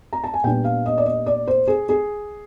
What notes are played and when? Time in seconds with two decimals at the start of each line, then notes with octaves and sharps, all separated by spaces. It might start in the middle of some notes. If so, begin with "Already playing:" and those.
0.13 A#5
0.24 A5
0.34 G#5
0.44 A#2 G3 B3 D4 G5
0.64 F5
0.86 D#5
0.98 D5
1.06 D#5
1.26 D5
1.47 C5
1.68 G#4
1.89 G#4